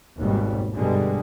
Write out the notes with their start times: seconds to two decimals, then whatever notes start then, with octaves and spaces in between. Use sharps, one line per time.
0.17 G#1 D#2 B2 G3
0.74 G2 B2 D3 G3 G#3